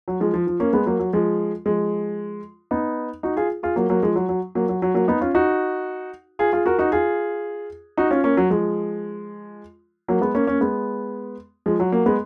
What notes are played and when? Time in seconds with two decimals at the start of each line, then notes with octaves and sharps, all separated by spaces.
0.08 F#3
0.20 F3 G#3
0.34 F3
0.47 F3
0.60 A#3 C#4
0.73 G#3 B3
0.86 F#3 A#3
1.00 F#3
1.13 F3 G#3
1.66 F3 G#3
2.71 B3 D#4
3.23 D#4 F#4
3.37 F4 G#4
3.63 F4 G#4
3.76 F#3 A#3
3.90 F#3 A#3
4.03 F3 G#3
4.16 F#3
4.29 F#3
4.55 F#3 A#3
4.69 F#3
4.82 F#3
4.94 F#3 A#3
5.08 B3 D#4
5.21 C#4 F4
5.35 D#4 F#4
6.39 F4 G#4
6.53 F4 G#4
6.66 F#4 A#4
6.79 D#4 F#4
6.92 F4 G#4
7.97 D#4 F#4
8.11 C#4 F4
8.24 A#3 C#4
8.37 F#3
8.50 F3 G#3
10.08 F#3 A#3
10.21 G#3 B3
10.35 A#3 C#4
10.47 A#3 C#4
10.61 G#3 B3
11.66 F3 G#3
11.80 F#3
11.92 F#3 A#3
12.06 G#3 B3